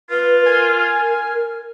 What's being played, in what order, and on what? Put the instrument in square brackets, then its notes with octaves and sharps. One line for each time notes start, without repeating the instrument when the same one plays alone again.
[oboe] F4 [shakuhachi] B4
[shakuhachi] A#4 [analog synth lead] G#5